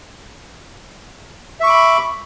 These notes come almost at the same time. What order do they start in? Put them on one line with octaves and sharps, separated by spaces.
E5 C#6 D6 B5